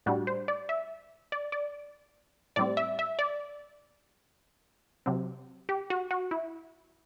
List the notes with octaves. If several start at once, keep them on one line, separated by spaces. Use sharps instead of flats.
A2 G3 D4 F#4
C5
D5
E5
D5
D5
A2 G3 C4 D5
E5
E5
D5
C3 F#3 C4
G4
F#4
F#4
E4